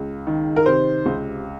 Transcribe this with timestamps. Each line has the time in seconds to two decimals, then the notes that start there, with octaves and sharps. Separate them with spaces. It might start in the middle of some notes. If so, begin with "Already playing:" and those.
Already playing: C#2
0.27 D#3
0.56 A#4
0.66 C3 C5
1.06 C#2